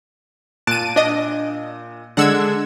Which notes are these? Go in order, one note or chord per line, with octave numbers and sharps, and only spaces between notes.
A#2 A5 F#6 D7 D#7
D4 D#5
D3 G#3 D4 F#5 E6 G#6